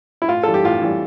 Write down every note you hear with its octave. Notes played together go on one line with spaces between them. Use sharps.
E4
A2 F4
E3 G3 A4
G4
A2 F4
E3 G3